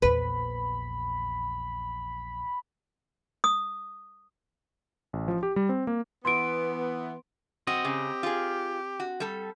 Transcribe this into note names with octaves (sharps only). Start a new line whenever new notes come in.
A#1 E2 B4 B5
D#6
A1
F3
G4
G3
C4
A#3
E3 B3 C6 D7
C4 F#4 D#5
C#3 G4
F4 G#4
F#4
G3 A4